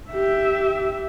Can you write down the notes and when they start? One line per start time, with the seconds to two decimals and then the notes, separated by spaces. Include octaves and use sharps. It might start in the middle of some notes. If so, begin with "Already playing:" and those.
0.10 G4 E5